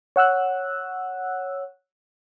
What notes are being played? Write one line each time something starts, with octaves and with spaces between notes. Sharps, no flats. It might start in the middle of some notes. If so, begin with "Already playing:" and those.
C#5 F#5 E6 F#6